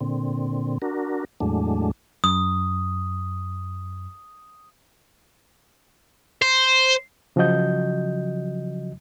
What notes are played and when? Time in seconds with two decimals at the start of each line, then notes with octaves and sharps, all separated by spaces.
0.01 A#2 D3 C4
0.82 D4 F#4 A#4
1.40 E2 A2 F#3 G#3 A3 D4
2.24 F#2 D#6
6.42 C5
7.36 C#3 F3 F#3 F#4 D#5 G6